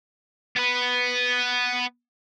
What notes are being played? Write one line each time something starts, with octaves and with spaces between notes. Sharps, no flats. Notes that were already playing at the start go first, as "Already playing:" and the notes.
B3 B4